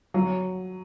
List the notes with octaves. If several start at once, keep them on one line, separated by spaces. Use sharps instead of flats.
F#3